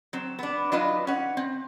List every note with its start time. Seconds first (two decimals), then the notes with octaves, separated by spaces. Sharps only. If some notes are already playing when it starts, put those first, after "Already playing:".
0.13 F#3 C4
0.39 B3 D4
0.72 F#3 D4 D#4 F4 B4 D#5
1.07 C#4 F#5
1.37 C4